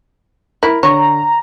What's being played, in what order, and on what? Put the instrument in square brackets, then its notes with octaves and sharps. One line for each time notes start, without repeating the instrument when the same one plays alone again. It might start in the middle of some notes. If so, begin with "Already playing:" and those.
[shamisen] E4 [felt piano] A#4
[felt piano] D3 [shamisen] C#5 [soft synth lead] A#5